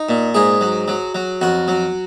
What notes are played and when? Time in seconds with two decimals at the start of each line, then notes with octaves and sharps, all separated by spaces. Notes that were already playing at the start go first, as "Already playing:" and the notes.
Already playing: D#4
0.09 A#2
0.34 G#2 G#4
0.61 F#3
0.88 F#3
1.15 F#3
1.41 F2 F#4
1.68 F#3